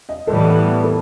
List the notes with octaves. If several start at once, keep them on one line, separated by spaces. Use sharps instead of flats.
D#5
A2 E3 G3 B3 A4
A4